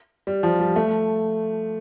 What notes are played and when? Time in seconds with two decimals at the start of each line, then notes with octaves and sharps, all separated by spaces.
0.27 G3
0.43 F3
0.59 G3
0.76 A3